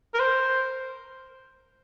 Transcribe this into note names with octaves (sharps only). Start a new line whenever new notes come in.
A#4
C5